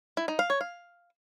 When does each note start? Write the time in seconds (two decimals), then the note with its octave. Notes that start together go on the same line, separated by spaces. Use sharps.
0.17 E4
0.28 D#4
0.39 F5
0.50 C#5
0.61 F5